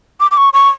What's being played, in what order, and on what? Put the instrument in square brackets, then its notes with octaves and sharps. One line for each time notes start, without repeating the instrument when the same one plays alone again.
[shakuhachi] D6
D6
C#6
C#6